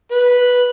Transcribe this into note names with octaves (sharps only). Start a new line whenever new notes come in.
B4